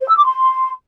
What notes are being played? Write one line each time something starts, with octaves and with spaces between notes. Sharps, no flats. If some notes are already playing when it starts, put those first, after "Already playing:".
C5
E6
D6
C6